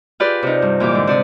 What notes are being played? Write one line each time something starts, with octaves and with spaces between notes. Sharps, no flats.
F4 G4 G#4 B4 D5
C3 D#4
G2
A#2 E3 G4 D6
G#2 D3
C3 D5 D#6